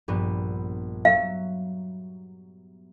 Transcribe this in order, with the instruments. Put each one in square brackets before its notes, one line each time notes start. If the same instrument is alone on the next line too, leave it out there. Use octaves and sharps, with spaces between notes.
[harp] A#1 G2 B3
[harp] F#3 E5 B6 [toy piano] F5